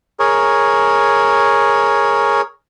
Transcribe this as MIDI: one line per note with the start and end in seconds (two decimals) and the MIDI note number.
0.19 2.41 68
0.19 2.41 70
0.19 2.41 73